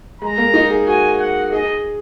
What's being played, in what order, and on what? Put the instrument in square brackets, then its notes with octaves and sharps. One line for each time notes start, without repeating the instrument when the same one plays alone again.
[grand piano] G#3 [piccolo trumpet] A#5
[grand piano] A#3
D#4
G#4
[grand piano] F#4 [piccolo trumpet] G#5
[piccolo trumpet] F#5
[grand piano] G#4 [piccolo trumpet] D#5